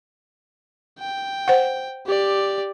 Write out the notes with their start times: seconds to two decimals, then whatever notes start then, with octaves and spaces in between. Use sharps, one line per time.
0.99 G5
1.48 C5 F#5
2.07 G4 D5